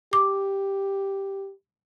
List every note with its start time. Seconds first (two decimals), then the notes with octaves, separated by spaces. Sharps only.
0.13 G4 D6